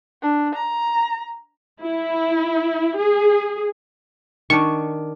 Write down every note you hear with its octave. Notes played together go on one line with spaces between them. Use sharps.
D4
A#5
E4
G#4
D#3 D4 C#6